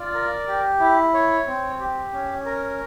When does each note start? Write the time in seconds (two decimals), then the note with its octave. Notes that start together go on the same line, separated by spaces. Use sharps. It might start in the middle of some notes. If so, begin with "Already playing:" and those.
Already playing: F4 D5
0.14 A#4
0.48 G4
0.80 E4
1.14 C#5
1.47 C4
1.80 G4
2.13 C#4
2.46 A#4